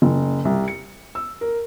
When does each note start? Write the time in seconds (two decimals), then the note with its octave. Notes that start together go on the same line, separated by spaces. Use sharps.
0.02 F#1
0.45 C2
0.68 C#7
1.15 E6
1.41 A#4